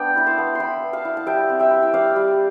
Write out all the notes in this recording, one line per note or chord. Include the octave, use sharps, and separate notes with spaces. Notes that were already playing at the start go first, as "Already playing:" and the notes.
Already playing: B3 D4 G5
E4 B5
A5 C6
B3
E4 G5 B5 C6
B3
F5 A5
E4
A5
G3 E5 G5
C4
E5 G5
E4
G5
G3 D5 F5
G3